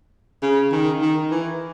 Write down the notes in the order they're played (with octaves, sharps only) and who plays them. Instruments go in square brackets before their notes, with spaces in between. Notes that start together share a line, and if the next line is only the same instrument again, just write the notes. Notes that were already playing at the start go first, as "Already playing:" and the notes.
[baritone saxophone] C#3
D#3
D#3
E3